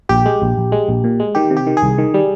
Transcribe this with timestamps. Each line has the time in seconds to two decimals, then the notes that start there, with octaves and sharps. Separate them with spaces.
0.09 A#1 G4
0.26 G#3
0.42 A#1
0.57 A#1
0.72 G#3
0.88 A#1
1.04 A#2
1.20 G#3
1.35 D#3 G4
1.50 C3
1.56 G4
1.67 D#3
1.77 G#4
1.82 C2
1.98 D#3
2.14 G3